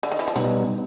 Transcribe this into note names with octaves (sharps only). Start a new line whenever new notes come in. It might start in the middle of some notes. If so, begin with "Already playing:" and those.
D3
D#3
E3
F3
B2 F#3 G3 B3 D#4